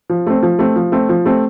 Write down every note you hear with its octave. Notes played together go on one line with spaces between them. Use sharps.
F3
A3 C4
F3
A3 C4
F3
A3 C4
F3
A3 C4